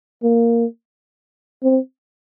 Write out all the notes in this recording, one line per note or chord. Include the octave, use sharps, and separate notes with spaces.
A#3
C4